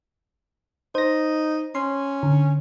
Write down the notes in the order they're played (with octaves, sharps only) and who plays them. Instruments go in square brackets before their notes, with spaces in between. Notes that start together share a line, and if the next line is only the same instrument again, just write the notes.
[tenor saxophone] D#4 [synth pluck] C5 A#6
[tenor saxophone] C#4 [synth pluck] C6
[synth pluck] D3